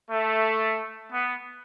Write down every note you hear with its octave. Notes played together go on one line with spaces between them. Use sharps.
A3
B3